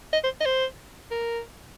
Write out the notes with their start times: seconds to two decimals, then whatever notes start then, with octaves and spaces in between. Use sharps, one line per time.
0.13 D#5
0.24 C5
0.41 D#5
0.45 C5
1.11 A#4